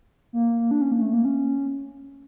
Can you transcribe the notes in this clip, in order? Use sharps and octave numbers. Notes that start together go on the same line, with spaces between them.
A#3
D4
C#4
A#3
A3
A#3
C#4